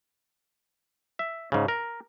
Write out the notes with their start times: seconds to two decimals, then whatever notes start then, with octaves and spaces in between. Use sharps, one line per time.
1.19 E5
1.52 G#2 C#3
1.68 A#4